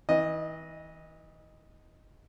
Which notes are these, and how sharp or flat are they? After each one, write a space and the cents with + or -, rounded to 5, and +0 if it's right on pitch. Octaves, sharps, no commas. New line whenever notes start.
E3 -35 D#5 +0